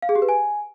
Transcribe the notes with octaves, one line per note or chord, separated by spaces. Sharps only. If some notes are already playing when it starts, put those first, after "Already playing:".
F5
G#4
G4
B4
G#5